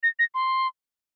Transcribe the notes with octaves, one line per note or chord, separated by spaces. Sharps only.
A#6
A#6
C6